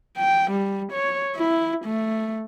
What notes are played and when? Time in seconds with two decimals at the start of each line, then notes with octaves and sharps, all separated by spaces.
0.17 G5
0.51 G3
0.93 C#5
1.36 E4
1.85 A3